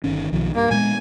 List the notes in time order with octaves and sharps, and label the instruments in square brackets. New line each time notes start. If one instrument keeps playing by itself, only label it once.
[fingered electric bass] G1 D#3 C#4
B1 D#3 F3
[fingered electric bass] G2 [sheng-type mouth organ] A#3
[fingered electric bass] A#2 G#3 B3 [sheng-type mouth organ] G#5